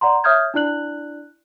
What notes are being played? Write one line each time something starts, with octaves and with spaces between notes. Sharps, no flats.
D5 F#5 A#5 C6
C#5 E5 D#6 F6 G6 G#6
D4 E4 D5 F#6 F#7